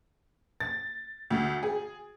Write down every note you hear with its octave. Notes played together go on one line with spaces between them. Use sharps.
A6
D2
G#4